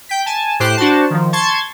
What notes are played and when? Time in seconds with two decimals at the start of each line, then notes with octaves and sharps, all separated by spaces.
0.09 G5 B6
0.26 G#5 A5
0.60 A2 G4 C5 F#6 C7
0.77 D4 F#4 C5 A5
1.10 D#3 F3
1.33 A5 C6 C#6 G#6 A6